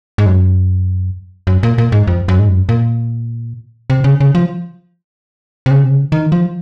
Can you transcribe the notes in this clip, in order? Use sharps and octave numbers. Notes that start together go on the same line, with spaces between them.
G#2
F#2
F#2
A#2
A#2
G#2
F2
F#2
G#2
F#2
A#2
C3
C#3
C#3
F3
C3
C#3
C3
C#3
D#3
F3